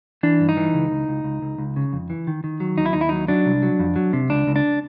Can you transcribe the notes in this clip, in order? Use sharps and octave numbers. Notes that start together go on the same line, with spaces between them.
E3 D4
G2
D#4
E3
C#2
C#2
C#2
C#2
C#2
C#2
C#3
F2
E3
D#3
D#3
F#3
D#2 D#4
E4
D#2 D#4
E4
F#3 D#4
F#3 D4
C2
F#3
F2
F#3
C3
C#2 D4
C#2
D4